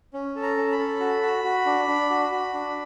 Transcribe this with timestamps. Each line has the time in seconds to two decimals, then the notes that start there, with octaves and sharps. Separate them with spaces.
0.14 C#4
0.36 A4
0.42 A#5
0.57 C#4
0.72 B5
0.79 A4
1.00 F#4
1.22 F#4
1.44 F#4
1.66 D4
1.88 D4
2.10 F#4
2.32 F#4
2.53 D4